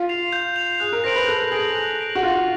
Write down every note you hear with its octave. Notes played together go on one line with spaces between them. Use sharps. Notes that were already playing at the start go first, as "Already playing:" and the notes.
Already playing: F4
C7 F7
G6
C7 F7
G#4 F#6
A#4
C5 A#6 D7 F#7
B4
A4 F#6
G#4 A#6 D7 F#7
F#6
A#6 D7 F#7
F#4
F4 F#6